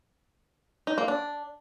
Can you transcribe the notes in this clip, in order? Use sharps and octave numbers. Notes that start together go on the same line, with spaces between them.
D#4
A#3
D4